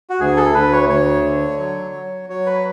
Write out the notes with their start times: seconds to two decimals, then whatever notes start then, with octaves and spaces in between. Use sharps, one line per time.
0.10 F#4
0.20 D2 G#4
0.37 A4
0.54 D2 B4
0.73 C#5
0.89 D2 C#5
1.24 D3
1.59 F#3
1.95 F#3
2.28 F#3 C#5
2.46 B4